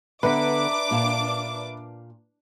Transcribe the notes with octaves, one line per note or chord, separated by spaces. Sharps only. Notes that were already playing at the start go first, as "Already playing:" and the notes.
D3 B3 D4 B4 E5 A#5 D6 B6
A#2 F5 A5